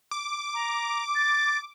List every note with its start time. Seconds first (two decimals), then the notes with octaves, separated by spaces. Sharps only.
0.11 D6
0.54 A#5
1.15 A6